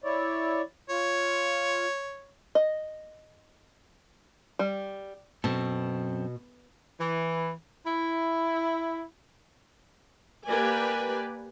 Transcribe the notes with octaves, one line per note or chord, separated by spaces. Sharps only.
E4 C#5 D5
F4 C#5
D#5
G3
F#2 B2 C4 A4
E3
E4
A#3 G4 B4 D5 G#5